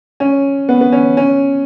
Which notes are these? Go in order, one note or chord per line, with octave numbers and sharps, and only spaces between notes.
C#4
B3
B3
C#4
C#4